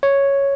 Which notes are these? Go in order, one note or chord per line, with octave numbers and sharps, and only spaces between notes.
C#5